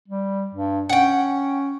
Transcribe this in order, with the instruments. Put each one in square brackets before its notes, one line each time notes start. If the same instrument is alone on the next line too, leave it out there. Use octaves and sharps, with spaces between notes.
[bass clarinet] G3
G2
[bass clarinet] C#4 [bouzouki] F#5 G5